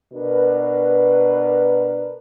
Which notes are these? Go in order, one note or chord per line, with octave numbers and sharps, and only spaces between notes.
B2 D4 A#4 B4